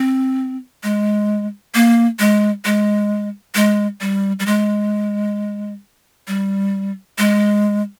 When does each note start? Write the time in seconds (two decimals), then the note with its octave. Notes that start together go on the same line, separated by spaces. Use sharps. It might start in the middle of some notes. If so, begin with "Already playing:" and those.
Already playing: C4
0.83 G#3
1.75 A#3
2.19 G#3
2.65 G#3
3.55 G#3
4.01 G3
4.40 G3
4.46 G#3
6.28 G3
7.18 G#3